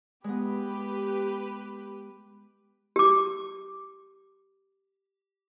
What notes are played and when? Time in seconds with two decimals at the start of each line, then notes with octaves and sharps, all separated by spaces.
0.24 G#3 B3 G4 B4
2.96 G4 D6